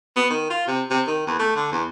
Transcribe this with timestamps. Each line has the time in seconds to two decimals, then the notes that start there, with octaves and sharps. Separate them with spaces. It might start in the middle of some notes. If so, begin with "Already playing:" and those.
0.17 B3
0.30 D#3
0.50 F4
0.67 C3
0.90 C3
1.07 D#3
1.27 E2
1.40 A3
1.56 D3
1.72 E2